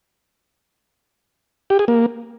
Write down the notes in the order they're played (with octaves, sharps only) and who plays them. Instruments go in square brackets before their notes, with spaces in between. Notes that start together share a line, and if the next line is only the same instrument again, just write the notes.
[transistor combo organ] G4
G#4
A#3